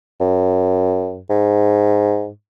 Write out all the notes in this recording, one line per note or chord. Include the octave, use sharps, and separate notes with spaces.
F#2
G#2